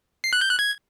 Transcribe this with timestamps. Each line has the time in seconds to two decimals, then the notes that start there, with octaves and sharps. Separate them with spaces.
0.24 C7
0.33 F#6
0.41 G6
0.50 F#6
0.59 G#6